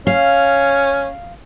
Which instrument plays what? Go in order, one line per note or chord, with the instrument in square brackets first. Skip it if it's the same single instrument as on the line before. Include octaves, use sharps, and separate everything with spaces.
[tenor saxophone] C#4 [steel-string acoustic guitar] F5